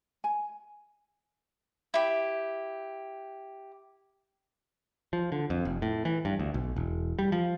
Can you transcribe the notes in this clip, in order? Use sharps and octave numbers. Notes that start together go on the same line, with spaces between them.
G#5
E4 G4
F3
D3
F2
F1
A2
E3
G2
D2
B1
E1
G3
F3